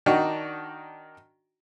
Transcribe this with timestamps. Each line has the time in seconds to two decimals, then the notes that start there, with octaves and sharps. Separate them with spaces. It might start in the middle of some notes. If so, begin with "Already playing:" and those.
0.06 D#3 D4 D#4 F#4